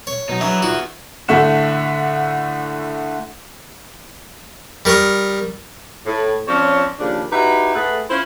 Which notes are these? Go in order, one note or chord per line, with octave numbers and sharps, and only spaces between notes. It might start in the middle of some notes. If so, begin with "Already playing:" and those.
C#5
B2 F#3 D#4
E3 F#3 B3 D4 E5 A#5
D#4 F4 F#4 D5
A2 D3 A3 E5 F#5 E7
G3 A#4 C#6 D#6
A2
F3 C4 C#4 F4 C#5 D5
D#2 C#3 F3 D4
D#4 E4 F#4 G4 B4 E5
A2 A3 G#4 B4 E5 F#5
C#4 E4 F4 C5